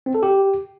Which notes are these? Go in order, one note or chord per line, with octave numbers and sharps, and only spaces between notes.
C4
A4
G4